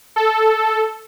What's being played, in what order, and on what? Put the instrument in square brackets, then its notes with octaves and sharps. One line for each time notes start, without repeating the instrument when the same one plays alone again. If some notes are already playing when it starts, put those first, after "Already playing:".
[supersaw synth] A4